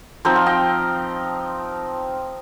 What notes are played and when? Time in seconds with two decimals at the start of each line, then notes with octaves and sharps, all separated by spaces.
0.25 F3 C4 D#4 G5
0.36 F5
0.46 D#5 G5